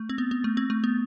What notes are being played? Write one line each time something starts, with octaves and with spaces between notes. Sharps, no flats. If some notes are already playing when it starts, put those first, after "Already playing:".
Already playing: A3
C4
B3
B3
A3
C4
A3
B3